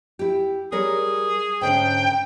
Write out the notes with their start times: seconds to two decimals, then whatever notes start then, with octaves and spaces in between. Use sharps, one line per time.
0.19 E4 G4
0.72 G3 G#4 A#4 C#5
1.61 G#2 D3 C#4 G5